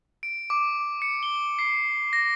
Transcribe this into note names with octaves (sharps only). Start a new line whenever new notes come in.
D7
D6
C#7
G7
C7
A#6